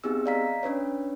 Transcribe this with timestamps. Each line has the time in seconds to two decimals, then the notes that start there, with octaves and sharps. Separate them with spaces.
0.04 B3 C4 D#4 G4 G#4 E6
0.26 D5 D#5 F5 A#5 B6
0.63 C#4 D4 B4 C#5